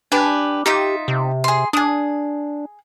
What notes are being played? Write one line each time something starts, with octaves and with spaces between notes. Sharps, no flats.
D4 G4 B4 G#5
D#4 F4 G4 E5
C3
G#4 C6
D4 G#4 D#6